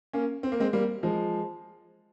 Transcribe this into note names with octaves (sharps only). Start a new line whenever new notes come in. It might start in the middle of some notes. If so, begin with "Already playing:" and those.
A#3 C#4
C4
A#3
G#3 C4
G3 A#3
F3 G#3